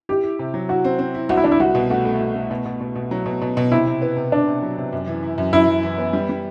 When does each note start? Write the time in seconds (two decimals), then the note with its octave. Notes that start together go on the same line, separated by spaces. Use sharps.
0.09 E4 G4
0.23 E4
0.39 C3
0.54 F#3
0.69 E4 F#4
0.84 C4
0.99 C4
1.14 E4
1.29 C2 F#4
1.37 E4
1.44 C2 D4
1.52 E4
1.60 C2 F#4
1.75 B2
1.90 A3 F#4
2.05 A3
2.21 B2
2.35 A3
2.51 B2
2.66 B2
2.81 B2
2.95 B2
3.11 F#3
3.26 B2
3.41 B2
3.57 B2
3.72 C3 E4
3.87 C3
4.02 B3
4.17 C3
4.32 C3 D4
4.47 C3
4.62 F#3
4.78 C3
4.93 F#2
5.07 E3
5.23 E4
5.38 F#2
5.53 F#2 E4
5.68 F#2
5.83 E3
5.98 B3
6.13 G3
6.29 G3